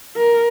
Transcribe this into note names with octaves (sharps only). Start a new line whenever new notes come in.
A#4